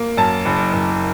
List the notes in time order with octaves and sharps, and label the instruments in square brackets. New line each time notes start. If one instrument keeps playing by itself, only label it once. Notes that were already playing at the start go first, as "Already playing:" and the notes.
Already playing: [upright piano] A#3
F#2 A5
F#1
F#1